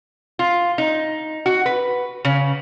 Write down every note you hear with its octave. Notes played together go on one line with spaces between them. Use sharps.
F4
D#4
F#4
B4
C#3